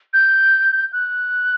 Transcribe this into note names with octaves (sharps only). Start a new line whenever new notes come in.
G6
F#6